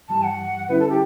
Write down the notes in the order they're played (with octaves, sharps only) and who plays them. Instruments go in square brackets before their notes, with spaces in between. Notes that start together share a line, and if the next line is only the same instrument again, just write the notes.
[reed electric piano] G2 E3 G3 [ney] A5
[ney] F#5
[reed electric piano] D3 G3 C#4 E4 [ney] B4
[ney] A4
G4